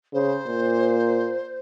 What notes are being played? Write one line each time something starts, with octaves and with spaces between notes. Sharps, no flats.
C#3 C5
A#2